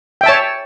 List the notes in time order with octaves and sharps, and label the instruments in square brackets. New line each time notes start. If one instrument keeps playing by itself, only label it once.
[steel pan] G5
E5
A5
C#5